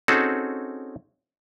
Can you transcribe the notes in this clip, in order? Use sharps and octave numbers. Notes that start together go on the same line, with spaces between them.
C4 C#4 D#4 F#4 G#4 A4